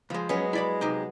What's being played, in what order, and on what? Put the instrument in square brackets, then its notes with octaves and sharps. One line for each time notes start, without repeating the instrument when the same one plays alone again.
[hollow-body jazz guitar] C#2 G#3 [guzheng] F3
[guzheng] F#3 B3 [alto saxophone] G#3 [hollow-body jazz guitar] C#4
[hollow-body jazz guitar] E4 D5 B5
C3 D#4 G4